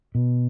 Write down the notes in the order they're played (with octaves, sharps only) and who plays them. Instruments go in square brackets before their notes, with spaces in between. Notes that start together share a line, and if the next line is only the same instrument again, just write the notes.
[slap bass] B2